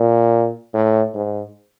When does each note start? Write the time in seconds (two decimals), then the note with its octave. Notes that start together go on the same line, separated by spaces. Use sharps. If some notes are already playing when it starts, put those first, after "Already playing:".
Already playing: A#2
0.74 A2
1.14 G#2